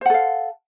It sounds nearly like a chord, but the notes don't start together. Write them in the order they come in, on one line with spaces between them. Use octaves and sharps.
C5 F#5 A4 F5